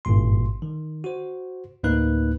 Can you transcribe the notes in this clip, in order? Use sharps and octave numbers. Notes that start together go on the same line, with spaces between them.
G#1 G2 A#2 C6
D#3
F#4 C5
D2 A2 A#3 D#4 B4 F#6